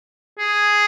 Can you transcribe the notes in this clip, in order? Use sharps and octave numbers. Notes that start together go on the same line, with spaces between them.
G#4